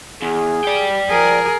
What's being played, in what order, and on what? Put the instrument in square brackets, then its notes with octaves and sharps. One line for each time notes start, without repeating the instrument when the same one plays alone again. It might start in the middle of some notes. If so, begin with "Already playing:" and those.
[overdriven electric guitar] E2 [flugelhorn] G#4
[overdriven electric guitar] D5 G5
[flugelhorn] F3 [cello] G#4 A#4